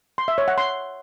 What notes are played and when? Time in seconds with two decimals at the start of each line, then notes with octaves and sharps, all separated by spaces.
0.18 C6
0.28 E5
0.38 C#5
0.48 F#5
0.58 C6